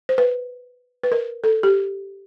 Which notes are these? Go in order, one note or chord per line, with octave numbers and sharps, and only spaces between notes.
C5
B4
B4
A#4
A4
G4